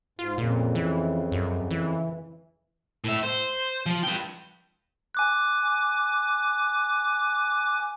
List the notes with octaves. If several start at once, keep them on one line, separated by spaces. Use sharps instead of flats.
G#2 F4
F2 A#2 C#3
E3
F#2
E3
A2 E5
C5
F3
B4 G5
G#5 D6 F#6